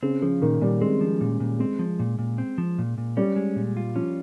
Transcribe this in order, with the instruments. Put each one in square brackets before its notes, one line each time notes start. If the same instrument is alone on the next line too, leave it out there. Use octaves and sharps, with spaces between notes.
[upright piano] C#3 [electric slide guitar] C4
[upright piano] C#3 [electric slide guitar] F3
[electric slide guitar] A#2 [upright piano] D#3
[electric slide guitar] A#2 [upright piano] G3
[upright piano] G#3 [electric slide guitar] C4
[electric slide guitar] F3
A#2
A#2
[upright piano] G#3 [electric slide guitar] C4
[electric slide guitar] F3
A#2
A#2
C4
F3
A#2
A#2
[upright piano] G3 [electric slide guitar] C#4
[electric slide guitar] G#3
A#2
F4
[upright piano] F3 [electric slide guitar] C#4